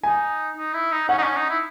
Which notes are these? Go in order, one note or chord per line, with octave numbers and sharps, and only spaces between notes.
D#4 G#5
D#4
E4
D#4
C#4 F#5
D#4
C#4
D#4
E4